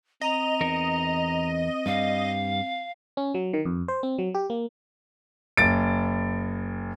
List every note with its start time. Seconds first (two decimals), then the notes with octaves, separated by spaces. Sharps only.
0.21 C4 D#5 A#5
0.61 E2 D#4 A#4
1.86 G2 G3 F5
3.17 C#4
3.34 F#3
3.53 D#3
3.65 F2
3.88 C5
4.03 C4
4.18 F#3
4.34 G4
4.50 A#3
5.57 F#1 A6 D7